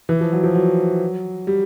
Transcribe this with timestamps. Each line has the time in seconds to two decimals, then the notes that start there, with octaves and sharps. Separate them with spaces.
0.09 E3
0.21 F3
0.32 F#3
0.43 F3
0.55 F#3
1.47 G3